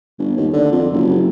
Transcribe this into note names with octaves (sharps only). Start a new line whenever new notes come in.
G1
D#2
D3
F2
F#1